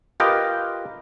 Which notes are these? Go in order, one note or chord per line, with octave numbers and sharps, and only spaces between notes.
F4 G4 A#4 B4 D#5 G5